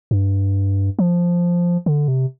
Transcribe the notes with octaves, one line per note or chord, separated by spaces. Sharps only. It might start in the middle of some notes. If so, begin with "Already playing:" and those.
G2
F3
D3
C3